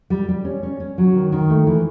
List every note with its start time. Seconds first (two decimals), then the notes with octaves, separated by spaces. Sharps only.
0.10 G3
0.29 G3
0.45 C#4
0.63 C#4
0.80 C#4
0.98 F#3
1.15 D#3
1.32 D#3
1.50 A3
1.67 E3